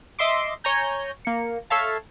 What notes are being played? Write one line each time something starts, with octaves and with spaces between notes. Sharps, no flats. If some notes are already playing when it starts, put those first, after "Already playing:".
D#5 E5 C6 D6
C#5 G#5 A#5 G6
A#3 C#7
A4 C#5 E5 F5 A5